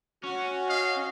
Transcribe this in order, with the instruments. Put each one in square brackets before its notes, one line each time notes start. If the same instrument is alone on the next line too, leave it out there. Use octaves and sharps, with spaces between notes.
[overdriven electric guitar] C#4 [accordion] F#4
[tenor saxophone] D#5 [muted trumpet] F5